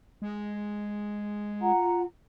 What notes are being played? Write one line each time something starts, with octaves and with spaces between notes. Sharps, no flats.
G#3
F4 F#5 A#5